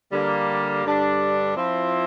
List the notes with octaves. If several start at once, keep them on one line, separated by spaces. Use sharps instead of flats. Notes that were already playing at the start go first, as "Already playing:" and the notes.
D3 G3 A#3
G2 D3 G3 D4
F3 C4 E4